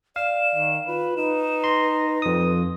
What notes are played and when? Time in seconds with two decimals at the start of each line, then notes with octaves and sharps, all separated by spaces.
0.16 D5 F5 E7
0.55 D#3
0.87 F4 B4
1.17 D#4 B4 E7
1.64 C6 A#6
2.22 F2 D#6